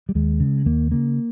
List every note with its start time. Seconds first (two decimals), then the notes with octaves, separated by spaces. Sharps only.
0.09 G3
0.15 D#2 G#3
0.40 C#3
0.66 D#2 A#3
0.92 C#3 A#3